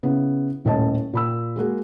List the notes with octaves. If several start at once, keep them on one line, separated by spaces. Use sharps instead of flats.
C#3 B3 E4
D#1 A2 C#4 D#5 A5
A#2 B5 E6
G#3 A#3 F#4 G#4